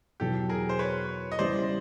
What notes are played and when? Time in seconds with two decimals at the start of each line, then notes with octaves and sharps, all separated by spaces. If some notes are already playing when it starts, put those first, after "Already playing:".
0.20 E2 B2 F#3 G4 A4
0.49 G#4 A#4
0.69 C5
0.79 B4 C#5
1.32 D#5
1.39 C#3 E3 G3 B3 C5 D5